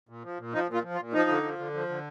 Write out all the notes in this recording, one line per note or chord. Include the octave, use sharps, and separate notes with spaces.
A#2
F3
A#2
F3 D#4
A#2 F4
F3
F4
A#2
F3 D#4
D3
F3
D3
F3
D3